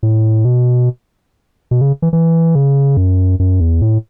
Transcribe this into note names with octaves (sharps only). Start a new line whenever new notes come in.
A2
B2
B2
C#3
E3
E3
C#3
F#2
F#2
E2
A2